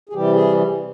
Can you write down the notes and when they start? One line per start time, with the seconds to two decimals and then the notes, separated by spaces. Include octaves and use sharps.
0.09 G#4
0.13 C3 E3 G3 G4
0.34 G#4